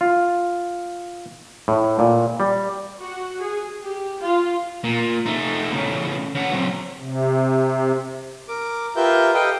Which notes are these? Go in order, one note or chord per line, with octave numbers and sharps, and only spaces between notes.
F4
A2
A#2
G3
F#4
G#4
G4
F4
A#2
A3 D#4
A2 C#3
C#3 F#5
F#3 C4
C3
A#4 D6
F4 G4 A#4 B4 E5 G6
G4 A4 B4 D#5 F5 G5